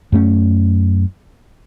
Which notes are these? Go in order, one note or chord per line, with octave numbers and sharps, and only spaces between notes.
F#2 A3 C#4